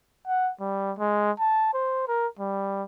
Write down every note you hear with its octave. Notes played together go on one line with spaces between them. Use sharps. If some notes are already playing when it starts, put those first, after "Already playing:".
F#5
G3
G#3
A5
C5
A#4
G3